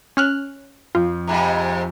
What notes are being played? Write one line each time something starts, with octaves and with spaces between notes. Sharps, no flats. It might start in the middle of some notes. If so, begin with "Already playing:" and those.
C#4 F6 F#6
F2 F4 C5
F2 G#2 C3 A#5